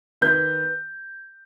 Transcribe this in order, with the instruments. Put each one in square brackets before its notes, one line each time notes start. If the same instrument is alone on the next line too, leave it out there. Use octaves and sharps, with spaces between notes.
[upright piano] D#3 B3 G6